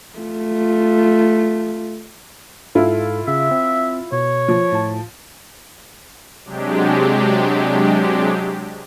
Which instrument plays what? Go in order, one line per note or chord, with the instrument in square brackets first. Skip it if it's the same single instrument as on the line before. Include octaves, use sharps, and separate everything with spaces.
[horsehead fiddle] A3 F4
[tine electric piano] G#2 A4 [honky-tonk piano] E4 F4
[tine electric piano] C#3 [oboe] E5
[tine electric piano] C4
[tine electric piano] B2 [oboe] C#5
[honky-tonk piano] F3
[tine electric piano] A2 A5
[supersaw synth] C3 F#3 G#3 D4 G4